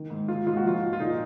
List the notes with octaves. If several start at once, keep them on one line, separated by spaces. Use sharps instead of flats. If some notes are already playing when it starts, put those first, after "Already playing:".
Already playing: D#3
G#2
G#3 F4
G#2 F4
F#4
F3 F4
G#3
F4
A#2 D#4